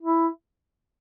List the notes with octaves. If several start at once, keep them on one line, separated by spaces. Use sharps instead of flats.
E4